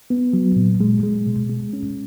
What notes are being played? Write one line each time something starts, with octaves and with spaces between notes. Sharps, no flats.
B3
F#3
A#2
G#3
G#3
B2
G#3
C#4